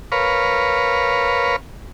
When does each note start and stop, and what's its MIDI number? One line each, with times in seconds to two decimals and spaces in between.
0.12 1.56 70
0.12 1.56 71
0.12 1.56 73
0.12 1.56 77